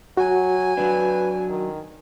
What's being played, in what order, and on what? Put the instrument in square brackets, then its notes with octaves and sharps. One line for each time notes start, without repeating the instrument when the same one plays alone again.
[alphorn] F#3 [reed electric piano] F#4 [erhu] G#5
[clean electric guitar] F#3 D4 [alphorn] B4
[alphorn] D#3